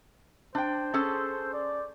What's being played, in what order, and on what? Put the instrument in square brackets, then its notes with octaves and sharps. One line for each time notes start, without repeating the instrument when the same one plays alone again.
[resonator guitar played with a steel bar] D4 G5 [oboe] C5
[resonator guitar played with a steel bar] C#4 G#4 A4
[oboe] D5